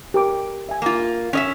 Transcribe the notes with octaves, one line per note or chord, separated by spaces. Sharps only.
G4 A#4 D6
E5 G#5
A#3 F4
C#4 D#5 E5